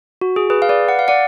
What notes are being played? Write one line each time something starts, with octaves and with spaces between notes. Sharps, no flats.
F#4
G#4
G#4 B4
F5
B4 D5
F#5
F5
D5 F#5